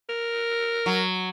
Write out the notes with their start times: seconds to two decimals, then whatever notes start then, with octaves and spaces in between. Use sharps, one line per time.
0.09 A#4
0.86 F#3